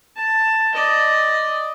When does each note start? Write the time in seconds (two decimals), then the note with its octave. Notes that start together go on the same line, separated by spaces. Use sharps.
0.16 A5
0.75 D5 D#5